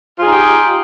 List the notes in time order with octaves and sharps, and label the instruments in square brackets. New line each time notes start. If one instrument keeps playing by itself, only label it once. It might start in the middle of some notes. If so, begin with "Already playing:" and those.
[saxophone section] F4
G#4
D#4
G4